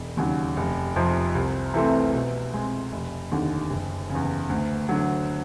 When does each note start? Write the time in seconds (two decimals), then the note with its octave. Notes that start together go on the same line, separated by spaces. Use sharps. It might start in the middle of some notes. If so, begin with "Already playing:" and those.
Already playing: E1
0.17 D#2 C#3 F#3
0.57 F1
0.96 F2 C3 F3
1.35 C2
1.74 C3 E3 A3 C4
2.13 B2
2.53 G#3 C4
2.92 F1
3.31 D#2 D3
3.71 F#1
4.10 C#3
4.15 E2
4.50 D2
4.89 D3 F#3